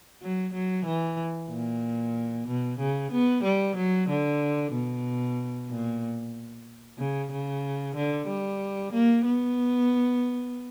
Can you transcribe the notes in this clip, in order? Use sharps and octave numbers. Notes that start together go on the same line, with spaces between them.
F#3
F#3
E3
A#2
B2
C#3
B3
G3
F#3
D3
B2
A#2
C#3
C#3
D3
G3
A#3
B3